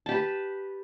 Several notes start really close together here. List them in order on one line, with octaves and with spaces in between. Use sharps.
A5 G4 B4